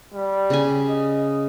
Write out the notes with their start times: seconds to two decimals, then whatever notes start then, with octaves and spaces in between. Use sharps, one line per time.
0.14 G3
0.50 C#3 G#5
0.89 D#5